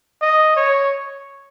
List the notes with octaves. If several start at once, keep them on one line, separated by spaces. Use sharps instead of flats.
D#5
C#5